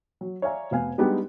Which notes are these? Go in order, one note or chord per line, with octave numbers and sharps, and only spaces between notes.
F#3
C#5 D5 E5 F5 G#5 A#5
F1 B3 F5 G#5
G3 G#3 B3 D4 D#4 G4